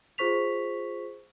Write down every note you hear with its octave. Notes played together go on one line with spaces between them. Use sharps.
F4 G#4 C5 C#6 B6 F7